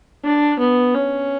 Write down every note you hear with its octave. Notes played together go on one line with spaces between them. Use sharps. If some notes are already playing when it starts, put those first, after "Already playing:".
D4
B3
C#4